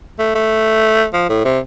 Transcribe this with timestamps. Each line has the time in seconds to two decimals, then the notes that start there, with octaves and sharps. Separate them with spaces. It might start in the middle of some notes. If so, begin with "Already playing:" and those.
0.19 A3
0.35 A3
1.13 F3
1.29 A2
1.45 C3